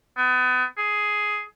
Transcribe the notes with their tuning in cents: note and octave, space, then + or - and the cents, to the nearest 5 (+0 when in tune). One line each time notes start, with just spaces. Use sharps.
B3 +35
G#4 +10